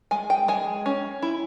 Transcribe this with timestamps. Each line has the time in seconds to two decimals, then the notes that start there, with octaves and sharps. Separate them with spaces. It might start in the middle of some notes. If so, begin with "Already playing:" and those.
0.11 G#3 G#5
0.30 G5
0.48 G#3 G#5
0.86 C#4
1.22 E4